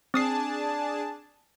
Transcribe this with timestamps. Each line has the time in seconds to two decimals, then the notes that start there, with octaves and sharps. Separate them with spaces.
0.14 C4 D4 G#4 A5 D#6 C7